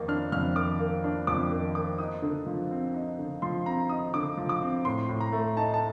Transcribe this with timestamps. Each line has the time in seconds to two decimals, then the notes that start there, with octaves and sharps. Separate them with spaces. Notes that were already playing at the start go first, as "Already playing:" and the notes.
Already playing: F2 D#3 A#3
0.08 D4 F6
0.32 F2 F6
0.55 D#3 D6
0.79 A#3
1.04 D4
1.27 F2 D6
1.51 D#3
1.75 A#3 D6
1.99 D#4 D#6
2.22 D3
2.46 F3
2.71 C4
2.94 D#4
3.19 D3
3.42 F3 C6
3.66 C4 A#5
3.89 D#4 D#6
4.14 D3 D6
4.37 F3
4.49 D6
4.62 C4
4.85 A2 C6
5.09 A2
5.20 A#5
5.32 A3
5.57 D#4 A5
5.74 A5